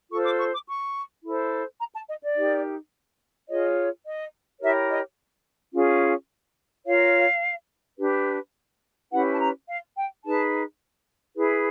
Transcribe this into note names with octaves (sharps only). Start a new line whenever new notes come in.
F4 A4 C5 C#6
D6
C#6
D6
C#6
E4 A4 C5
A#5
A5
D#5
D5
D#4 G4 A#4
F4 G#4 C#5 D#5
D#5
E4 G4 A#4 C#5 E5
D#5
C#4 F4 G#4
F4 A#4 C#5 F5
D4 G4 B4
C#4 E4 G4 B4 F#5
A5
A#5
F5
G5
D#4 G#4 B4 A5
E4 G#4 B4